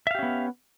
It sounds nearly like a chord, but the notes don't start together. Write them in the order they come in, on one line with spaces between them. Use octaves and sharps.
E5 F5 G4 C#4 B3